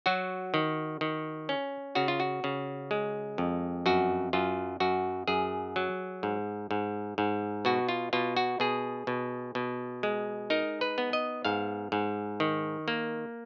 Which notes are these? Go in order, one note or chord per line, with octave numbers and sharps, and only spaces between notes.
F#3 F#4
D#3
D#3
C#4
C#3 F#4
F4
F#4
C#3
G#3
F2
F#2 F#4
F#2 F4
F#2 F#4
F#2 G#4
F#3
G#2
G#2
G#2
B2 F#4
F4
B2 F4
F#4
B2 G#4
B2
B2
G#3
D#4 A#4
B4
B3
D#5
G#2 F5
G#2
D#3
A#3